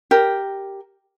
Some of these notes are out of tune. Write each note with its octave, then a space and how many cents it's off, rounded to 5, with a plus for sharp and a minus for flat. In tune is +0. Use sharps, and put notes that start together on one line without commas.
G4 +0 A#4 +0 G5 +0